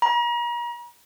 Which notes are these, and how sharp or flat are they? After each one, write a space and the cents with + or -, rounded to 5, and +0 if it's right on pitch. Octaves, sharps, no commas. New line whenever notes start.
A#5 +40